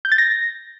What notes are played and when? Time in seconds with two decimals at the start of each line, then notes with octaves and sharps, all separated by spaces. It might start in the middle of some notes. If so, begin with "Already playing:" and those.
0.05 G6
0.12 A6
0.18 A#6